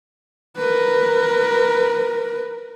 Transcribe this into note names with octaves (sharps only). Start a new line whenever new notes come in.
A#4 B4